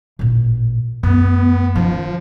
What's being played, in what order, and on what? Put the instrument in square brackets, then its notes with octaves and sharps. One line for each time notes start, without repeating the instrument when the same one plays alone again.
[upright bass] A1 A#2
[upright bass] F#2 A3 [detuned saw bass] B3
[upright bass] D#3 C#4 [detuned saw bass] F3